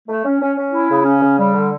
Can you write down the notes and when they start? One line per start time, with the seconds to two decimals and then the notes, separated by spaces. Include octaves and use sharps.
0.08 A3
0.25 C#4
0.42 C#4
0.57 C#4
0.73 E4
0.89 C#3
1.05 C#4
1.22 C#3
1.38 G3
1.54 D3